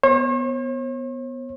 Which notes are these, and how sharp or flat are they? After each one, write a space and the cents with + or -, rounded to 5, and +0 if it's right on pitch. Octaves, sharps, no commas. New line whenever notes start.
B3 +0 C#5 -45